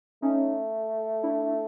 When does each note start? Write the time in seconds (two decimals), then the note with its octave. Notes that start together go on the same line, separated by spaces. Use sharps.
0.22 A3 C#4 D#4
1.23 D4 E4